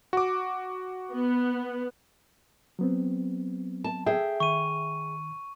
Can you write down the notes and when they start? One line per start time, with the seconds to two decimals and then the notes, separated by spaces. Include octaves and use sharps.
0.13 F#4 D6
1.11 B3
2.79 F#3 B3 C4
3.84 A5
4.06 G#4 E5 G5
4.40 D#3 C#6 D#7